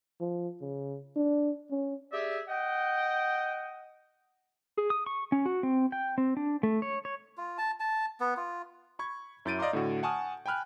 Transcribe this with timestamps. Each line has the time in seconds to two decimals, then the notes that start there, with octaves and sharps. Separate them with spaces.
0.21 F3
0.61 C#3
1.16 D4
1.71 C#4
2.12 G4 G#4 D5 E5
2.48 D#5 F#5 G5
4.77 G#4
4.90 D#6
5.06 C#6
5.32 C#4
5.46 F#4
5.63 C4
5.92 G5
6.18 C4
6.37 D4
6.63 A3
6.82 C#5
7.05 C#5
7.37 F4
7.58 A5
7.80 A5
8.20 B3
8.37 F4
8.99 B5 C#6 G#6
9.45 F#2 E4 G6 A6 D7 D#7
9.59 D5 D#5 F5 A#5 C6 D6
9.73 A2 D3 F#4
10.03 F#5 G#5 A5 C#6 D#6 F6
10.46 G5 G#5 B5 F6 F#6